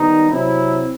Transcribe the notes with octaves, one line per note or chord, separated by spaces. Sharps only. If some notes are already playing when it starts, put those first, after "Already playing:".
Already playing: D#3 G3 B3 D#4
C3 F#3 C4 E4